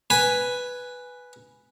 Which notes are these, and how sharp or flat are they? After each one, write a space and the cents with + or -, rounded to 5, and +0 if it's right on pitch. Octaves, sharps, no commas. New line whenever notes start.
B4 +0 G#5 +0